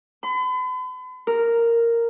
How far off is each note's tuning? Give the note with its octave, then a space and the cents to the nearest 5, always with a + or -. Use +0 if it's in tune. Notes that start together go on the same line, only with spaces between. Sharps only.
B5 +45
A#4 -5